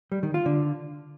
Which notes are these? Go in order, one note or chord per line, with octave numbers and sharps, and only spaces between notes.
G3
D#3
F4
D3